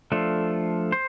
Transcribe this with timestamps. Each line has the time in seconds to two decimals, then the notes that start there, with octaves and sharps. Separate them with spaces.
0.12 F3 A3 D4 F4 A4
0.92 C5